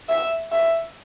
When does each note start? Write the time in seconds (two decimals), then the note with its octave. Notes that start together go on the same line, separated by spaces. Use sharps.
0.09 E5
0.52 E5